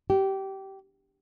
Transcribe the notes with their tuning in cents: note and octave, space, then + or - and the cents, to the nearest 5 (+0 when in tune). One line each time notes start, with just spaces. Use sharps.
G4 -20